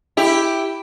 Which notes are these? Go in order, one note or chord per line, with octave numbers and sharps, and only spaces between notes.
E4 G4